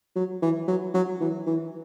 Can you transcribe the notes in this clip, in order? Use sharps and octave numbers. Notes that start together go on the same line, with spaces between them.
F#3
E3
F#3
F#3
E3
E3